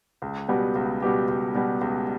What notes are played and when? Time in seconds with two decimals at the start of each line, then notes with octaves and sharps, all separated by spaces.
0.22 C#2
0.49 B2 G3 B3 G4
0.75 C#2
1.02 B2 G3 B3 G4
1.28 C#2
1.54 B2 G3 B3 G4
1.81 C#2